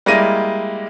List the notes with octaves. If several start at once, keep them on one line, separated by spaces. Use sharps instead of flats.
G3 G#3 A#3 E4 A#6 D#7